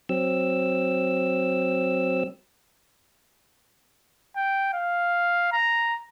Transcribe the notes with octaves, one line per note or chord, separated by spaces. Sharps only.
F#3 C4 E6
G5
F5
A#5